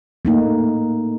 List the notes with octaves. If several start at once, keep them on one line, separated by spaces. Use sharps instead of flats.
A3 A#3 D#4